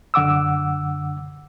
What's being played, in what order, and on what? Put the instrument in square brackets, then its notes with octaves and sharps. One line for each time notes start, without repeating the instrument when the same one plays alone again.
[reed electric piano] F#2 D3 F#5 D6 E6